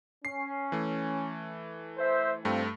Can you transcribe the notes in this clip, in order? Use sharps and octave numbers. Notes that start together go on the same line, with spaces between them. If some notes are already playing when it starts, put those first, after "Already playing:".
C#4 C7
E3 A3
C5 E5
G2 A3 C4 F4